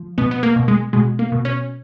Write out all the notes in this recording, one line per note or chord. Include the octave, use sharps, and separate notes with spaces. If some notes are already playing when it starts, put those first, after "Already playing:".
Already playing: F3
B2 B3
B3
A#3
B2
G#3
B2 G#3
A#3
B2
C#4